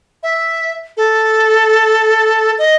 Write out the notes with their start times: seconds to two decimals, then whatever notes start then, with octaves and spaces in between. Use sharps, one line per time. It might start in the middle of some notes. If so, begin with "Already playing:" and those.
0.23 E5
0.97 A4
2.59 D#5